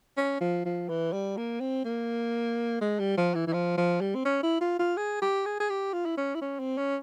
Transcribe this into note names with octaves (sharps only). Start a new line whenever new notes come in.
C#4
F3
F3
E3
G3
A#3
C4
A#3
G#3
G3
F3
E3
E3
F3
F3
G3
C4
C#4
E4
F4
F4
G#4
G4
G#4
G#4
G4
F4
E4
C#4
E4
C#4
C4
C#4